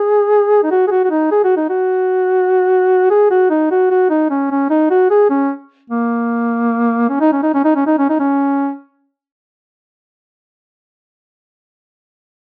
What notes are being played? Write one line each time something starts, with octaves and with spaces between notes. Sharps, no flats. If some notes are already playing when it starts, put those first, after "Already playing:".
Already playing: G#4
D#4
F#4
G#4
F#4
F#4
D#4
G#4
F#4
D#4
F#4
G#4
F#4
D#4
F#4
F#4
D#4
C#4
C#4
D#4
F#4
G#4
C#4
A#3
C#4
D#4
C#4
D#4
C#4
D#4
C#4
D#4
C#4
D#4
C#4